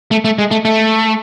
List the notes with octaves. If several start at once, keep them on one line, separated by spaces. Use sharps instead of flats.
A3
A3
G#3
A3
A3